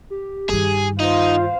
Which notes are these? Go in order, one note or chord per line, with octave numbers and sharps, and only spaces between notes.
G4
G2 D#3 G#4
D#4 F4 C5 F5